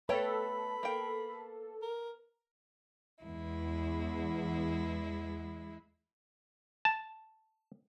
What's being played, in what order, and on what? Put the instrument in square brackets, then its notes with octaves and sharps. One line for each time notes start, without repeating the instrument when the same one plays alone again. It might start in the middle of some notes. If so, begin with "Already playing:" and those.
[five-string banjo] A3 C#5 G5 [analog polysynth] A4 [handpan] B4 [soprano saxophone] B5
[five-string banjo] A#3 G5
[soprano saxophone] A#4
[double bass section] E2 [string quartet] G#3 E4
[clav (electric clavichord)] A5